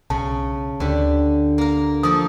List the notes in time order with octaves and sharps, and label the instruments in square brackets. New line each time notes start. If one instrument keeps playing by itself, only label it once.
[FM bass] B1 [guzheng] C#3 [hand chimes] A5
[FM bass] D2 [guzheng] D3 G4 B5
[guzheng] A#3 A#4
[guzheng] F3 A#3 A4 [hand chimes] D#6